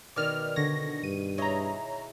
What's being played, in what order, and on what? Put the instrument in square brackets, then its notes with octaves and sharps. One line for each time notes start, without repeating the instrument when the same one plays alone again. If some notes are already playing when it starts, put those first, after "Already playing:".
[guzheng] B2 D#3 [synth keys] D5 F6
[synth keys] D3 A#6 [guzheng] C#5
[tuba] G2 [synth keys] D#7
[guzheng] E4 G#4 D#5 [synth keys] C#5 A#5